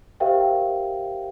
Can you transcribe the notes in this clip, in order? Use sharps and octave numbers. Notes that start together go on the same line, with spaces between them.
G4 A#4 C5 E5 F5 G5